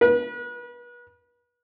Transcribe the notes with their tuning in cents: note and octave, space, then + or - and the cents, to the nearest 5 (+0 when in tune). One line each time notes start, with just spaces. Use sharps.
B4 -35